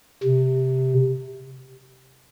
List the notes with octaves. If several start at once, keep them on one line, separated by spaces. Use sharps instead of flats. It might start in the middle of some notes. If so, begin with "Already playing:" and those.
C3